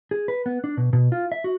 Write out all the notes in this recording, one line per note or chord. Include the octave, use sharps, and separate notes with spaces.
G#4
B4
B3
D4
B2
B2
F4
E5
F#4